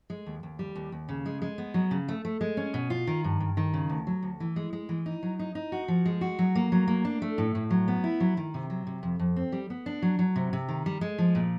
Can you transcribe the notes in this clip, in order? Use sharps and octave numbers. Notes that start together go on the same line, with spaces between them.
G#3
D#2
D#2
G3
D#2
D#2
C#3
G#3
G#3
B3
F#3
C#3
A3
A3
G#3
C#4
B2
F4
D#3
G2
G2
D#3
C#3
D2
F#3
D2
E3
G#3
G#3
E3
D#4
F#3
D#4
D#4
F#4
F3
G#3
F#4
F#3
A#3
F#3
A#3
D4
A3
A2
A2
F#3
B3
E4
F#3
D#3
C3
F#3
C3
F2
F2
C4
G3
B3
D4
F#3
F#3
C3
C3
D#3
G3
G#3
F3
A#2